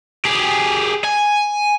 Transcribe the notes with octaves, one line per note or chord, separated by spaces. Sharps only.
G4 G#4
G#5